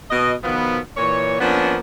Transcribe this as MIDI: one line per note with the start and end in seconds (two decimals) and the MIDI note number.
0.11 0.34 47
0.11 0.34 75
0.44 0.80 47
0.44 0.80 51
0.44 0.80 53
0.44 0.80 59
0.97 1.39 46
0.97 1.39 52
0.97 1.39 73
1.41 1.77 53
1.41 1.77 58
1.41 1.77 59
1.41 1.77 61
1.41 1.77 62